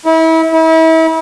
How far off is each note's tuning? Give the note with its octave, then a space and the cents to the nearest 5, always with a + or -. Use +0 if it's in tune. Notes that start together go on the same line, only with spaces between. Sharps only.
E4 -30
E4 -35